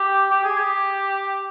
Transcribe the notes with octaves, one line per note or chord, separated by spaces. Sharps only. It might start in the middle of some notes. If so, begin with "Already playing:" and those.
Already playing: G4
G4
G#4
G4